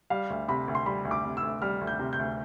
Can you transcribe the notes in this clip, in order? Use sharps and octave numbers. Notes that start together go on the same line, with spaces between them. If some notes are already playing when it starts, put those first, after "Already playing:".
G3 F5
D2
C3 B5
D2
C6
G3 B5
D2
D6
C3
E6
D2
G3 F6
D2
G6
C3
G6
D2